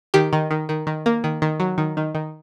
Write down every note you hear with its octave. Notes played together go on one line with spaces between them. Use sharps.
D#3 G4
D#3
D#3
D#3
D#3
A#3
D#3
D#3
F#3
D#3
D#3
D#3